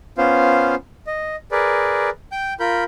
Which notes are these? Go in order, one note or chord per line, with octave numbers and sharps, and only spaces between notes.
B3 C#4 F4 C5 F5
D#5
G#4 A#4 B4 D5
G5 G6
F4 A#4 B5 G6